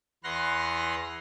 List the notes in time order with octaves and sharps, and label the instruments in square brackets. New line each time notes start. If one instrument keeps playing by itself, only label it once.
[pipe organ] E2 B4 F#5 C6 F6 A#6